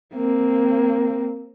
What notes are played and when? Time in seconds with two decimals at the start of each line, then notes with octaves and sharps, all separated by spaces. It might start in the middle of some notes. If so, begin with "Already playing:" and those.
0.14 A#3 C4